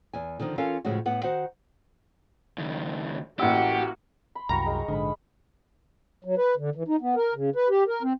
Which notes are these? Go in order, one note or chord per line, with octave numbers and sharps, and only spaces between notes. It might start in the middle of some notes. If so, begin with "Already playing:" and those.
E2 G#5
D3 D#3 F3 D#4
E3 C#4 F4 A4 A#4 F5
A2 C#3 F3 G#3 A3 F#4
A2 B3 F#5
D#3 F#4 C5 F#5
C#2 D#3
A1 A#3 F#4 G4 F#5 E6
B5 C6
C2 F#2 F#3 F5 G5 A#5 C#6
G#3
A#1 G#2 D3 B5 D#6
F#3
B4
D3
E3
D#4
B3
A#4
C#3
B4
G4
A#4
C4